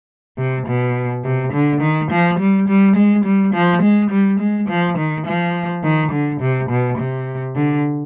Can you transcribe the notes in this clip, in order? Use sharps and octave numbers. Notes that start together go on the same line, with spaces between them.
C3
B2
C3
D3
D#3
F3
G3
G3
G#3
G3
F3
G#3
G3
G#3
F3
D#3
F3
D#3
D3
C3
B2
C3
D3